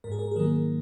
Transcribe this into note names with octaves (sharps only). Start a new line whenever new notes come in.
G#2 A#4
G#4
A#4
G#4
D#3 F#3 A#3 A#4